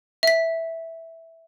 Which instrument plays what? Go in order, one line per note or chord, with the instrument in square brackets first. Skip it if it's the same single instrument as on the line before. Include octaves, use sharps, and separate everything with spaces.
[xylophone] E5 B6